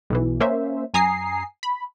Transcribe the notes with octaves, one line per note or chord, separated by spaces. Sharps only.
B1 B2 E3
A#3 C#4 C5 E5
F#2 G#5 A#5 D#6 C7
B5